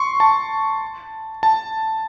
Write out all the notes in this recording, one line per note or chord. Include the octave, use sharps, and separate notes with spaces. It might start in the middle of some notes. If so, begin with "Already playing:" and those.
Already playing: C6 C#6
A5
A5